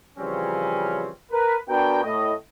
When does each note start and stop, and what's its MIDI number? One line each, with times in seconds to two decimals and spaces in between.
0.18 1.09 49
0.18 1.09 52
0.18 1.09 53
0.18 1.09 55
0.18 1.09 60
0.18 1.09 61
1.32 1.56 70
1.32 1.56 71
1.69 2.03 59
1.69 2.03 62
1.69 2.03 66
1.69 2.03 70
1.69 2.03 79
2.03 2.32 45
2.03 2.32 75